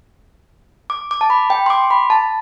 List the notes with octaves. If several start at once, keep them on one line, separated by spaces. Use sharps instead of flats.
D6
D6
A5
B5
G5
C6
D6
B5
A5